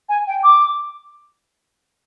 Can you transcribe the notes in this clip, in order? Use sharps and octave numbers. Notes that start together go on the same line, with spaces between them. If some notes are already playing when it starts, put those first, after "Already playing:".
G#5
G5
D6